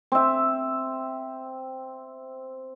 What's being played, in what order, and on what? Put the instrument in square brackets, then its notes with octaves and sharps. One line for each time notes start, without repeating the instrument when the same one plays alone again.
[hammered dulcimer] C4 E5